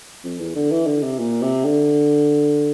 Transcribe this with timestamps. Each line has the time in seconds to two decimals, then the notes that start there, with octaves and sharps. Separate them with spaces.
0.24 F2
0.39 E2
0.55 D3
0.72 E3
0.87 D3
1.02 C3
1.19 A#2
1.42 C3
1.65 D3